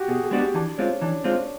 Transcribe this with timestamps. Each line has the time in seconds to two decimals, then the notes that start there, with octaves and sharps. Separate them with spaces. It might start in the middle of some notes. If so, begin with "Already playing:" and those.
Already playing: F#4 G4
0.08 B2 G#4
0.24 G#4
0.31 G#3 B3 D4 F#4
0.40 G4
0.55 E3 D4
0.78 G#3 C4 C#4 F4
1.01 E3 D4
1.24 G#3 C4 F4